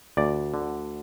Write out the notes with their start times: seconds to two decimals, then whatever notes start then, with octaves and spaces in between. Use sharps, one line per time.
0.17 D2 D5
0.54 D3